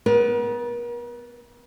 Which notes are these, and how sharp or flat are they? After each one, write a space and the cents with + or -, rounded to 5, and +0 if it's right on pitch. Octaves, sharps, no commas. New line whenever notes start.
B3 +15 A#4 +45